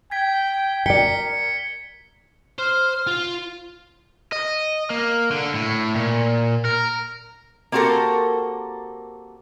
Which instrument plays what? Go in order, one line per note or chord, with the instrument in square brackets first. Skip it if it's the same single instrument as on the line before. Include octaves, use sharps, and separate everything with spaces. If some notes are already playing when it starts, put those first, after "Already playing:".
[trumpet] G5 [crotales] G#6 B6
[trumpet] A#4 [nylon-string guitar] D5 G5 [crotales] B6 C#7 G7
[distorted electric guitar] C5 [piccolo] F6
[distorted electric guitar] F4
[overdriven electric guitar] D#5
A#3
D3
A2
A#2
A#4
[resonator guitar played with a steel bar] A#3 C4 F#4 G4 A4 A#4